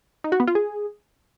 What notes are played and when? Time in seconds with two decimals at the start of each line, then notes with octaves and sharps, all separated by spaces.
0.24 D#4
0.32 F#4
0.40 B3
0.48 F4
0.55 G#4